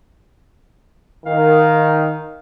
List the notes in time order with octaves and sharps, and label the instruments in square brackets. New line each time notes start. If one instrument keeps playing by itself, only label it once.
[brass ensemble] D#3 [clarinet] F5